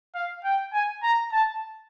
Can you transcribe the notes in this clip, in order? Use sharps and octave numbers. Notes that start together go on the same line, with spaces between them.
F5
G5
G#5
A#5
A5